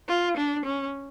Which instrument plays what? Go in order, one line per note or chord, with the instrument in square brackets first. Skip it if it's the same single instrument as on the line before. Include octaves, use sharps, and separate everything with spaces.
[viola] F4
D4
C#4